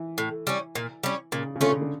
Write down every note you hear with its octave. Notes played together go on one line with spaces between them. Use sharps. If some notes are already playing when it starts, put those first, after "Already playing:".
Already playing: E3
A2
G3 C#4
A#2
G3 C#4
A#2 C#3
C#3
D3 A3 C#4 F4
C#3
D3